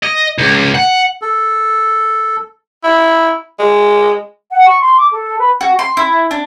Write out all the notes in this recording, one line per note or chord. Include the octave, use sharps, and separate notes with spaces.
D#5
C#2
F#5
A4
E4
G#3
F#5
C#6
C6
D6
A4
B4
F#4
C6
E4
D4